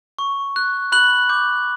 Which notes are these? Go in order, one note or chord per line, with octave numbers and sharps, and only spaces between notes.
C#6
F#6
B5 F#6 F#7
D6 G6